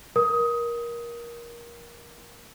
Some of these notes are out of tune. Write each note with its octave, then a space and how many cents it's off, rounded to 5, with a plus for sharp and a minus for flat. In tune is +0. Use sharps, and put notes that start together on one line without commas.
A#4 +20 D#6 +15